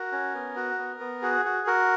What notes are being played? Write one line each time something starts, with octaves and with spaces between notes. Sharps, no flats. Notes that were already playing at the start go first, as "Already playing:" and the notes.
Already playing: F#4 A#4
C#4
B3
F#4
B3
B3
F#4 G#4
F#4
F#4 A#4